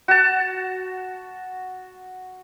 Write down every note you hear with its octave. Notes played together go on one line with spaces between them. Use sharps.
F#4 A5